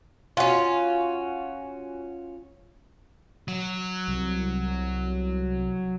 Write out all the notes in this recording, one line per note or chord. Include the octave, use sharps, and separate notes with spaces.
C#4 F4 F#4 G#5
F#3
C2